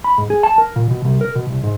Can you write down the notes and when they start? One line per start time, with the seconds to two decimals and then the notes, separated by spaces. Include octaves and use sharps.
0.04 B5
0.18 G#2
0.30 G#4
0.43 A5
0.58 A#4
0.76 A#2
0.91 B2
1.05 C2
1.21 A#4
1.36 B2
1.50 C2
1.64 G#2